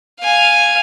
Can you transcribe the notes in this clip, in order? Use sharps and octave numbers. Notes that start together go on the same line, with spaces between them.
F5 G#5